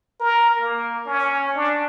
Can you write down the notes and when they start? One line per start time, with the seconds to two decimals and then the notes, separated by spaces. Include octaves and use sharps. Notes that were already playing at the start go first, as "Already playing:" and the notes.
0.20 A#4
0.61 A#3
1.06 C#4
1.55 D4